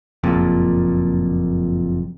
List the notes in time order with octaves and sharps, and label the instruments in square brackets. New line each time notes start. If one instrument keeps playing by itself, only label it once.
[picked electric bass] F#1 F2 A#2